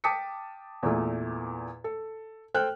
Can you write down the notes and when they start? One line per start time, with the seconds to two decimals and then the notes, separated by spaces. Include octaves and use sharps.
0.04 G5 A5 D6 D#6 B6 C#7
0.83 E2 A#2 A3
1.84 A4
2.54 A4 C5 G5 F6 F#6